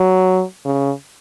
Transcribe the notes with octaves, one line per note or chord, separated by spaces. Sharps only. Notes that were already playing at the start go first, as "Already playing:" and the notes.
Already playing: F#3
C#3